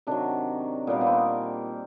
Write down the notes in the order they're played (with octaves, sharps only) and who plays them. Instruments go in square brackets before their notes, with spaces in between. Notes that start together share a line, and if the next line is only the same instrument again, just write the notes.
[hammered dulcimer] C3 D#3 F#3 D4
A#2 G3 A#3 B3
B3
C4